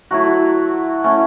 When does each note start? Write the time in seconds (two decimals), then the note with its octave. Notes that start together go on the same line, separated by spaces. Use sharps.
0.11 F#3 A3 E4 F#4
1.04 A3 C#4 E4